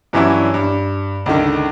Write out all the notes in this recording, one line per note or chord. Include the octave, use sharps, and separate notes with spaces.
G2 E3 F#3 C#4 D4 E4
G2
C#2 D3 D#3